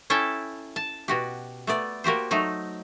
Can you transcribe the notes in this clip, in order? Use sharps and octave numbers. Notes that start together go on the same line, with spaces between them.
C#4 E4 A4 E5 G5 A5
A5
B2 F#4 G4
A3 B3 D5
A#3 F#4 G4 C5
F#3 A3 D#4